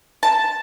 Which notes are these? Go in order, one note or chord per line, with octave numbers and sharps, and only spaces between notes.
A5